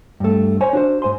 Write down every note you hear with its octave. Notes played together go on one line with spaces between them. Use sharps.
G2 A3
C5 C#5 G#5
D4 F#4 C5
G#2 C5 G#5 C6